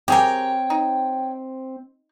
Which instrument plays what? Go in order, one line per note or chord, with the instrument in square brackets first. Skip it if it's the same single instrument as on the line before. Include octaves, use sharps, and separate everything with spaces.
[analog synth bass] C4 [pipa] G4 G#4 A#4 [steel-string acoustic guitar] C#5 G5
[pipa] D#4